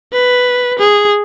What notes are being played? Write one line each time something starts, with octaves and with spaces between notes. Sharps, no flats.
B4
G#4